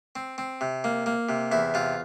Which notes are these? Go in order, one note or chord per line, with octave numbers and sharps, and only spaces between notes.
C4
C4
C3
A#3
A#3
C3
E2 E4
C3 F4